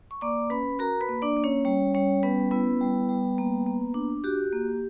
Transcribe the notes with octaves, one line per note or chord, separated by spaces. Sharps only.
C#6
A#3 D5 D6
C#4 B4 B5
F#4 A#4 A#5
B4 B5
A#3
D4 D5
A#3
C#4 C#5
G3 C#4 C#5
G3 C#4 C#5
B3 C#4 B4
B3 E4 B4
G3
G3
A#3
A#3
D4
F#4 G4
A#3